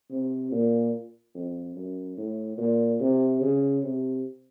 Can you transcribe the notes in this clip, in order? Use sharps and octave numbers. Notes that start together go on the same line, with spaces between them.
C3
A#2
F2
F#2
A2
A#2
C3
C#3
C3